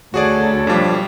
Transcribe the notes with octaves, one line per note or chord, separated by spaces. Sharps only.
D2 F#4 G#4 A4 C#5 D5
B1 F3 G3 D4